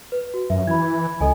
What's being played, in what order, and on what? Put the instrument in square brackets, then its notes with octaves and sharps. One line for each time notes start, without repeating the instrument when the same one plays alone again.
[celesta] B4
F#4
[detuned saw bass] F#2 [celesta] E5
[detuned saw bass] E3 [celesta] B5 G#6
[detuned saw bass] C#2 [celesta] A4 D#5 G#5